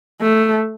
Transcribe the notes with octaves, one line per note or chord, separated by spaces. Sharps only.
A3